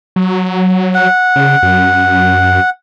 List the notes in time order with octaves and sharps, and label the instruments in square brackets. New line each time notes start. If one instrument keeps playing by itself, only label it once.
[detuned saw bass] F#3
[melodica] F#5
[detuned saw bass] C#3
F#2